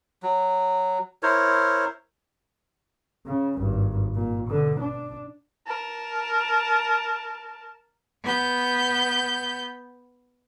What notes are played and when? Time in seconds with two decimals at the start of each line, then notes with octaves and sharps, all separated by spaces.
0.23 F#3
1.23 E4 A#4 C5 C#5
3.27 C#3
3.58 G#1 G2
4.15 A#2
4.49 B2 D3
4.81 D4
5.66 A#4 A5
8.24 B3 G6